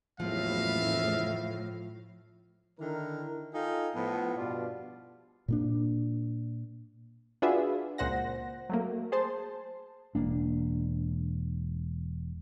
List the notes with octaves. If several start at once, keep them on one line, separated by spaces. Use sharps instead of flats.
F#1 E2 A2 F3 E5 F5
D3 D#3 E4 A#4
D#4 F4 A4 F5 G5 G#5
A2 F3 A3 B3
G2 B2 B3 D4 F4 D5
A#2 A#3 D4
D4 F4 F#4 G#4 B4 E5
C#2 A#2 C5 F#5 A#6
F#3 A3 A#3
G#4 C5 A5 C6
E1 A#3 D4